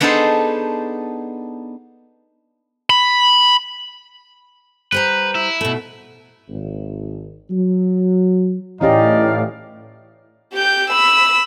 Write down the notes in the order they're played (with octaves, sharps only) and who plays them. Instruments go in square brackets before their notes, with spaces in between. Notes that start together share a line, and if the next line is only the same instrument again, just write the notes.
[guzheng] B3 D4 D#4 G#4 A4 C5
[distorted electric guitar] B5
[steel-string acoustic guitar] G3 C5 A#5 [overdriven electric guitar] B4
[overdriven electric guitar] E4
[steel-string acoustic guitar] B2 A3
[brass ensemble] G#1
F#3
[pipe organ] A2 [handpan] E3 C#4 G4 [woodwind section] D#4 D5 F5 [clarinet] D#5
[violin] G4 G6
B5 E6